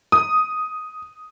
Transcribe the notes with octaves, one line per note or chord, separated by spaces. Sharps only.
D#6